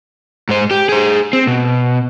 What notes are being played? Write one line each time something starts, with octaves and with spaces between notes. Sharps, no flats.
G#2 C5
G4
G#4 C5
C4
B2